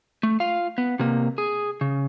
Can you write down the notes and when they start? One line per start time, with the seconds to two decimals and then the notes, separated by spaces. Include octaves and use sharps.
0.23 A3
0.40 F4 F5
0.78 B3
0.99 C3 A#3
1.38 G#4
1.81 C#3